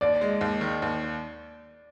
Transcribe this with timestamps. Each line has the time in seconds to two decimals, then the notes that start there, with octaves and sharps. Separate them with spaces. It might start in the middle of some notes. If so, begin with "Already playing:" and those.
0.01 D#2 D5
0.21 G#3
0.41 D#2
0.61 D#3
0.82 D#2